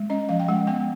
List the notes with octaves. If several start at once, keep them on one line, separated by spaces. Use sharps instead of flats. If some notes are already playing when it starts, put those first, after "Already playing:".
Already playing: G#3
C#4 D#5
F3 F5
G5
G#3 F#5
B3 G5